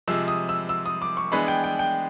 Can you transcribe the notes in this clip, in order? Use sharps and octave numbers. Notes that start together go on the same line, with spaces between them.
C3 F3 G#3 E6
D#6
E6
E6
D#6
D6
C#6
E3 G#3 B3 D4 B5
G5
G5
G5